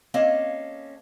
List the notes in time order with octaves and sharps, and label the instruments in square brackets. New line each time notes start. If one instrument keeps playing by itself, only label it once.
[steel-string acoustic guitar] A#3 C4 C#4 A4 D#5 F5